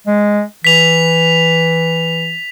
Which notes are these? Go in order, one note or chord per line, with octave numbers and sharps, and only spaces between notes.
G#3
E3 B6 F7